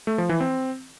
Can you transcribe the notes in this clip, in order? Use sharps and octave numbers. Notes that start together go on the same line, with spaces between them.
A3
F3
E3
C4